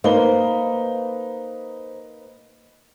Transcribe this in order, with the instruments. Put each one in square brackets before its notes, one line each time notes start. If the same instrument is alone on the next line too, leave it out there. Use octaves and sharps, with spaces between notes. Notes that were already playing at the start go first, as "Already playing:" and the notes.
[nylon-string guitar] A#3 [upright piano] D#4 B4 G7 [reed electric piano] C5